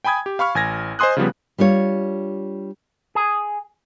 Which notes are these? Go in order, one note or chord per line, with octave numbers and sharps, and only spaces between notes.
G5 G#5 B5 D#6 G#6
G4
F5 B5 C#6 F6
A1 G#5 G#6 A#6
C5 D#5 G#5 C6 D#6 F#6
C#3 F3 G3 B3
G3 D4 F4 C#5
G#4